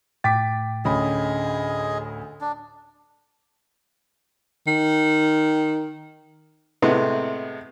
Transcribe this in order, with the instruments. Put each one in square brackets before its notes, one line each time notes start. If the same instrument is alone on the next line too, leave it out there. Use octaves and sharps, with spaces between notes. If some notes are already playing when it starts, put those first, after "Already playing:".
[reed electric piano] A2 G5 A6 [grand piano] D6 B6
[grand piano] D2 C#4 B5 [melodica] G#4 D#5
[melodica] D4
[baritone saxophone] D#3
[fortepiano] A2 C3 G#3 B3